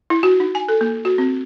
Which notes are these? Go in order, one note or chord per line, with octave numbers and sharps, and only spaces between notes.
E4
F#4
D#4
G#5
A4
A#3
F#4
C4